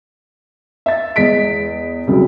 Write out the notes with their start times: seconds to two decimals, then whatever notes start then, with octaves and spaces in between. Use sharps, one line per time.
0.86 E5 A6
1.16 E2 G#3 D#5 B6 D7
2.07 C2 C#3 F#3